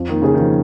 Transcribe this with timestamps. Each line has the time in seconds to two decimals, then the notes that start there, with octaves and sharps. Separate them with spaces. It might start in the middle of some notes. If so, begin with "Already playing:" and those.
Already playing: F2 F4
0.09 D#3 A#3
0.22 C#3 G#4
0.35 D#3
0.40 F3